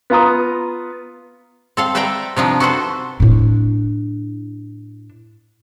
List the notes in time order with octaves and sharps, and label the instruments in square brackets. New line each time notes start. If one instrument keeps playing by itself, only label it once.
[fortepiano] B3 F4 A#5 D#6
[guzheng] C4 A4 F5
B4 C5 D5 E5 G5 A#5
C3 F3 D4 D#4
F#4 A4 B4 C5
[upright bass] A2 D4